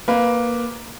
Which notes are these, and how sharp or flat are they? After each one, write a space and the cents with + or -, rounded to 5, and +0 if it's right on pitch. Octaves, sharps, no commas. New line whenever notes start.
A#3 +10 B4 +0